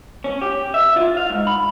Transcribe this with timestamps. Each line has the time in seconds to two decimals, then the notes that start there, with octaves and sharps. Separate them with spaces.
0.24 C#4
0.41 G4
0.74 E5
0.96 F4
1.17 F5
1.30 G#2
1.47 B5